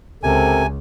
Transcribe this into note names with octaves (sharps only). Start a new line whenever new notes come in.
C#2 C3 C4 A4 A#4 G#5